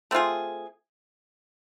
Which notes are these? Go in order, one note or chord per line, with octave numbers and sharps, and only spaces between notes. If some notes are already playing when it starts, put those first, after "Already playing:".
A3 C4 F4 G#4